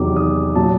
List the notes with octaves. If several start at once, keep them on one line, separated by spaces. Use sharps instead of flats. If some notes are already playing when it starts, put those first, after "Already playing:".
Already playing: E2 C3 D#3 F#3 D6
D#6
A#2 F#3 A5